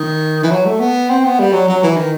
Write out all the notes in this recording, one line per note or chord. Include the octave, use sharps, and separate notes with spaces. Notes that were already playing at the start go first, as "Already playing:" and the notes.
Already playing: D#3
E3
F#3
A3
B3
C4
B3
G3
F#3
F#3
E3
D#3